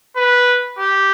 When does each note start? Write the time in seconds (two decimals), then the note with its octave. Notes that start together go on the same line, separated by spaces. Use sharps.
0.17 B4
0.79 G4